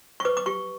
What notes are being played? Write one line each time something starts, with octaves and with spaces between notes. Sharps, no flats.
C#6
B4 D6
D6
G4 C#6